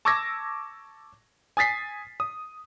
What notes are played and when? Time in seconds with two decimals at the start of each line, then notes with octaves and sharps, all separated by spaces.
0.05 A5 C#6 D6 E6 G#6 A#6
1.57 G#5 D#6 A6 B6 C7
2.20 D#6